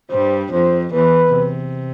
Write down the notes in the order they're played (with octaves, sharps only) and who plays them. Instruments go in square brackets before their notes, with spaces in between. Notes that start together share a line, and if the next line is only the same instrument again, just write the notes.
[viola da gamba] G2 G3 [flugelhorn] C5
[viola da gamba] F2 F3 [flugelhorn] C5
[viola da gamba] E2 E3 [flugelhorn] B4
[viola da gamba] C3